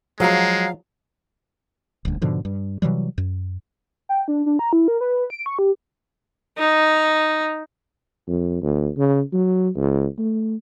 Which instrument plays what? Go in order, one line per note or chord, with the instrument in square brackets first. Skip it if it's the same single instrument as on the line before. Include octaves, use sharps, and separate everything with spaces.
[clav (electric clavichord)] F3 F#4 G#4 [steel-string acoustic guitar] F#3 A#5 [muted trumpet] G#3 [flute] F5
[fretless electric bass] D#1 D2
G#2 B2 D3 F3
G2
C3 E3 F#3 G3
F#2
[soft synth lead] G5
D4
D4
A#5
E4
A#4
B4
D7
C#6
G4
[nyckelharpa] D#4
[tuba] F2
D2
C#3
F#3
C#2
A3